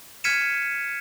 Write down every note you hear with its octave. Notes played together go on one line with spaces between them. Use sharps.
F6 G#6 B6 C#7 D#7 E7